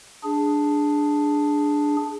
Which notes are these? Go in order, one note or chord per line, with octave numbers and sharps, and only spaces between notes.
D4 G#4